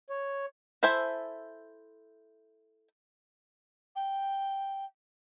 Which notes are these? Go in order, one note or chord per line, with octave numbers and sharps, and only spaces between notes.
C#5
E4 A4 C5 E5 G#5
G5